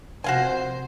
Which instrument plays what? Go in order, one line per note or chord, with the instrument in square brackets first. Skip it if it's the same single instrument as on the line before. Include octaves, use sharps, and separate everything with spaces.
[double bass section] C3 F3 [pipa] F#4 F5 G#5 [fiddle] C5